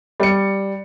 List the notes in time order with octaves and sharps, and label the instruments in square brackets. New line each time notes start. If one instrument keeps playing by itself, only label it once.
[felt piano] G3 C#7